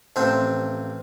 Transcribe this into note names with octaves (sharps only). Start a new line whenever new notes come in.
A1 C3 F3 C4 C5